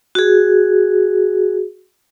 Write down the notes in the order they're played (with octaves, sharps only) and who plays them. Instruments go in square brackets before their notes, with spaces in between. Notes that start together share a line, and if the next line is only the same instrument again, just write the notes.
[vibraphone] F#4 G#4